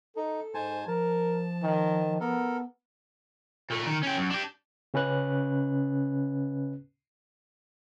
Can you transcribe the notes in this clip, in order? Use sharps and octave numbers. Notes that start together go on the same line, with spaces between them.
D#4 A4
G#2 C5 G#5 A5
F3 A#4 A5
D#3
B3 A4 A#4
A#2 A3
D#3
C#4 G5
F#2
D4 G4
C#3 C#4 B4 F#6